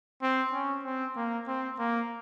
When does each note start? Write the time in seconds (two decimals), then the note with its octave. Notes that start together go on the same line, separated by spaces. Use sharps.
0.22 C4
0.52 C#4
0.84 C4
1.16 A#3
1.47 C4
1.78 A#3